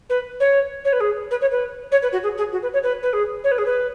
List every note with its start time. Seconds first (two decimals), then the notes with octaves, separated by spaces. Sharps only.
0.09 B4
0.40 C#5
0.85 C#5
0.93 B4
1.00 G#4
1.31 B4
1.41 C#5
1.51 B4
1.92 C#5
2.02 B4
2.12 F#4
2.23 G#4
2.38 G#4
2.52 F#4
2.62 B4
2.73 C#5
2.83 B4
3.03 B4
3.13 G#4
3.44 C#5
3.51 B4
3.58 G#4
3.66 B4